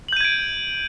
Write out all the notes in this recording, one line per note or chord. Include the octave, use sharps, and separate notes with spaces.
G6 G#6 D7 D#7 F#7